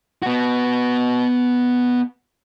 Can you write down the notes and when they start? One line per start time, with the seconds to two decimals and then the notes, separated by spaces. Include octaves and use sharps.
0.22 B3 F#4